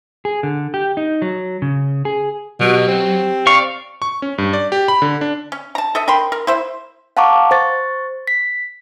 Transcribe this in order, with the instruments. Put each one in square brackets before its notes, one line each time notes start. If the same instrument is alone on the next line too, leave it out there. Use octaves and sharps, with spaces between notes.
[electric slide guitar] G#4
D3
G4
D#4
F#3
C#3
G#4
[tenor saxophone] B2 [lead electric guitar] F#3 [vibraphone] G4
[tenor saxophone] C4
[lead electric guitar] D5 [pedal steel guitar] F5 C#6
[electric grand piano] C#6
C#4
G2
D5
G4
B5
D3
D4
[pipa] C#4
A5 A#5
A4 D#5 E5
A#4 G5 B5 C6
A#4
E4 C5 E5
[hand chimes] F5 F#5 A5 A#5 C#6 D6
C5 C#6 A6
B6